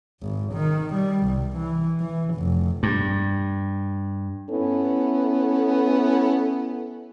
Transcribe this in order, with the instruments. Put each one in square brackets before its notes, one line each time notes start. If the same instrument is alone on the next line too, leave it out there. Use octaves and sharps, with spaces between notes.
[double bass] G#1
D#3
G3
C2
E3
E3
F1
[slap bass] G2
[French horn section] B3 C#4 E4 A4